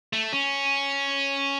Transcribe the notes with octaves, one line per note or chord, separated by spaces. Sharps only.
A3
C#4